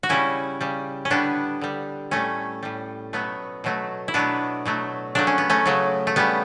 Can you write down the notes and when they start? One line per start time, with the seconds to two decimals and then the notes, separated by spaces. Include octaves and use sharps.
0.03 F#4
0.09 C#3 G3 C#4 E4
0.61 C#3 G3
1.05 C#4
1.10 D3 G3 B3 D4
1.61 D3 G3
2.11 A2 G3 A3 C#4
2.63 A2 G3
3.13 B2 F#3 A3 B3
3.64 B2 F#3 A3
4.08 E4
4.14 B2 F#3 A3 B3 D4
4.65 B2 F#3 A3
5.15 C#3 F#3 A3 D4
5.27 C#4
5.38 B3
5.50 A3 C#4
5.65 C#3 F#3 A3
6.07 A3
6.16 C#3 G3 B3